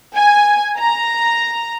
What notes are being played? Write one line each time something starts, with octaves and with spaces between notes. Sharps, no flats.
G#5
A#5